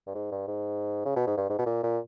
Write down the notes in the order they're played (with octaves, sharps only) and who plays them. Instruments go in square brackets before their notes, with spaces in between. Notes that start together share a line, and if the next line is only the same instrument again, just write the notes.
[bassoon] G2
G#2
G2
G#2
C#3
B2
G#2
G2
G#2
B2
A#2
A#2